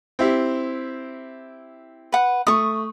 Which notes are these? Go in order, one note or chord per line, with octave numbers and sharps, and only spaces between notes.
C4 E4 G4
B4 F#5
A3 C#6 D#6